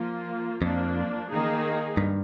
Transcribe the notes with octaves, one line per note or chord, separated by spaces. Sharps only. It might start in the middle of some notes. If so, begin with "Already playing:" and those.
Already playing: F3 A#3 F4
F2 F3 A#3 D4
D#3 A#3 D#4 G#4
G2